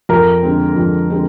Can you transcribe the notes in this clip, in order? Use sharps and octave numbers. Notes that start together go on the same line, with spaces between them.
F2 A#4 A#5
D3 G#3 C4
F2
D3 G#3 C4